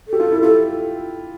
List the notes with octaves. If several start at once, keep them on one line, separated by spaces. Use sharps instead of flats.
A4
G4
F4
E4
F4 A4